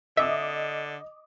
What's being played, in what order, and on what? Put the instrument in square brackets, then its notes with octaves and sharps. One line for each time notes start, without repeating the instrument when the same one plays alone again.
[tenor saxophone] D3 [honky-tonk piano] D#5 D6 D#6 [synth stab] E5